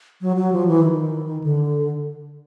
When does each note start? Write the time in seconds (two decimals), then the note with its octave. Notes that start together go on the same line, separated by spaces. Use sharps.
0.21 F#3
0.36 F#3
0.53 F3
0.67 E3
0.83 D#3
1.44 D3